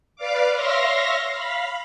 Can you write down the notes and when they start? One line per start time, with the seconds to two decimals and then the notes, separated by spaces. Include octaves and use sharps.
0.16 B4 D5 F5 D6
0.54 C#5 E5 F5 C6 A#6
1.33 F5 B5